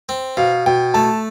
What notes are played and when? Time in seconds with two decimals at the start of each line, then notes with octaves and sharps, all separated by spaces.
0.09 C4
0.37 B2 F5
0.66 B2 G5
0.94 A3 A5